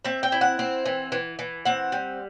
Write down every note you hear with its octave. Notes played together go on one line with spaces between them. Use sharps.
C4 E5
G5
E4
F#5
C4
E3
E3
E3
C4 F#5
G3